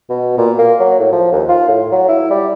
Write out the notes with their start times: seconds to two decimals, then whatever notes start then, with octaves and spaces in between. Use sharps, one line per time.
0.10 B2
0.38 A#2
0.58 A#3
0.80 F#3
0.99 A2
1.12 F3
1.33 D#2
1.49 F4
1.68 A2
1.92 F#3
2.08 E4
2.30 G3